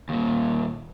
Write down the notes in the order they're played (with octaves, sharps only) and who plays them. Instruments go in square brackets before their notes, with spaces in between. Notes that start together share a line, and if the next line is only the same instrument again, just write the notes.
[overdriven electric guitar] D#2 A#2